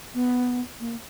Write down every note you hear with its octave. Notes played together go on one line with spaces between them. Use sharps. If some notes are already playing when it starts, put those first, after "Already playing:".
B3
A#3